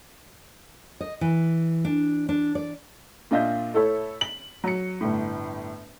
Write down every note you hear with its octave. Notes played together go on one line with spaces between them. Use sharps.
D#5
E3
D4
D4
D5
A#2 D4 F4 D#5 E5 G6
A3 E4 A4 C#5
F#7
F#3 C#7
G1 A2